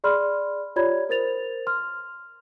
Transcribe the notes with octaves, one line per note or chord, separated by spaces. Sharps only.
G#4 D5 B5 C6 F6
F4 G4 C#5 D5 B5 G#6
A#4 C5 A6 F7
C6 F6